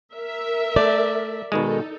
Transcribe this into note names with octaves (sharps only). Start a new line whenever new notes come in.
A#4 E5
A3 D5
B2 D#3 G#3 D#4 A4